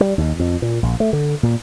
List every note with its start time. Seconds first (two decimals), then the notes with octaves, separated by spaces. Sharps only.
0.01 G3
0.18 D#2
0.39 F2
0.62 A#2
0.83 A#1
1.00 A3
1.13 D3
1.43 A#2